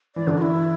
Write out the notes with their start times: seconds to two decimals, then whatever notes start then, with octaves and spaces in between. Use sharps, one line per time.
0.16 E3 D5
0.27 D3 D4
0.38 E3 E4 F#4